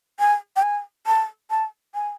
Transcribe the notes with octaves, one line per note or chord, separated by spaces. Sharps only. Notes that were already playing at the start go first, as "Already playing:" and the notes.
G#5
G5
G#5
A5
A5
G#5